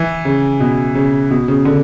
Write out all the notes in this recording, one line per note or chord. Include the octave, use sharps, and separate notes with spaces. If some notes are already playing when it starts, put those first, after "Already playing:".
Already playing: E3
C#3
B2
C#3
B2
C#3
D3